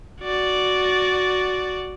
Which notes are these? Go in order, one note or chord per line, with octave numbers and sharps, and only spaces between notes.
F#4 D5